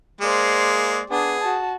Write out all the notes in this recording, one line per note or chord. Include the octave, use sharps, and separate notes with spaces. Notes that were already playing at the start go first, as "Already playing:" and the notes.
G#3 A#3 C5 D5
B3 D4 G#4
F#4 A5